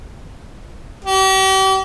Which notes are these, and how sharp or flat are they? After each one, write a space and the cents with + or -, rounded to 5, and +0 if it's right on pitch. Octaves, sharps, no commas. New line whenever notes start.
G4 -40